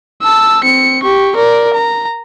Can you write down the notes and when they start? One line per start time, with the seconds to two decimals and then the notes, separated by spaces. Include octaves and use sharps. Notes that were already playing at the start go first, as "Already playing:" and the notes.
0.22 A5 E6
0.64 C4 C#7
1.03 G4 C#6
1.36 A#4 D5
1.74 A#5